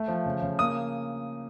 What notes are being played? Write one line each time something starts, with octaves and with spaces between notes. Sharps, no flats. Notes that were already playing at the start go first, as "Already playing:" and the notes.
Already playing: A3
F3
C#3
C#3
A#3 D#6